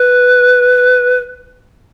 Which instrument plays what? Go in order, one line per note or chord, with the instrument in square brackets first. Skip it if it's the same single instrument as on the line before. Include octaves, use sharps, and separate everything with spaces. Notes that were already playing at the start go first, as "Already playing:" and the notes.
Already playing: [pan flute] B4